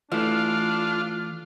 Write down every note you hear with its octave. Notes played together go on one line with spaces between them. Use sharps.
E3 A3 D4 F4 F5